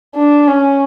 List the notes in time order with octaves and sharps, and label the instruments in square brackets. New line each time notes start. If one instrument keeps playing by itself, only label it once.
[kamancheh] D4
C#4